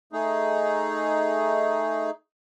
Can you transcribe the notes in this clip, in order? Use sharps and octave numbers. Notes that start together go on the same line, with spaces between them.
A3 D#4 G#4